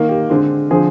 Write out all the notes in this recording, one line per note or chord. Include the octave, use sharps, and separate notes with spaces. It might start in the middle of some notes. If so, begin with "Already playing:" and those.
Already playing: D#3 A#3
G4
D3 G#3 C4
D3 F3 C4 G#4